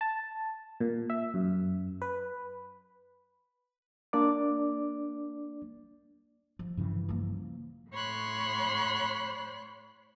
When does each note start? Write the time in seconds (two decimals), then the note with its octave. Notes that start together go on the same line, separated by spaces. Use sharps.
0.01 A5
0.80 A#2
1.10 E5
1.34 F#2
2.02 B4
4.13 A#3 D4 D5 D6
6.59 F3
6.77 G2 C#3 E3
7.09 F3 A#3
7.91 A2 C#5 B5 C6 F#6